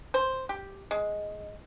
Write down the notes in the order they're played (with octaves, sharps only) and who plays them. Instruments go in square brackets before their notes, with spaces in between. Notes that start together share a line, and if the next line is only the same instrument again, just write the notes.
[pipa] C5
G4
G#3